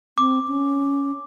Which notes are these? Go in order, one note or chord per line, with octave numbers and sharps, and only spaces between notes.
C4 D6
C#4